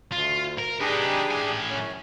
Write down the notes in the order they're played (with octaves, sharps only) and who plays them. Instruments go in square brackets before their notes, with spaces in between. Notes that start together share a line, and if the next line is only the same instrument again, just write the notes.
[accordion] D2 [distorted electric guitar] F4
[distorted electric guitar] A#4
[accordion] D4 G4 G#4 [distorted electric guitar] D#4 B4
[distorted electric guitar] A2 G#5
[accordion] F#2 C#4